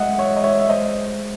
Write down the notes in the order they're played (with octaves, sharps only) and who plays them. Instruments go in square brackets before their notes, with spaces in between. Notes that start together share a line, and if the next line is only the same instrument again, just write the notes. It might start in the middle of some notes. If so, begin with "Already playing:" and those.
Already playing: [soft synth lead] G#3 [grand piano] D#5 E5 F#5
[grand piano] C#5 E5
D#5
C#5 E5
E5
[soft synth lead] G#3 [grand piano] C5 D#5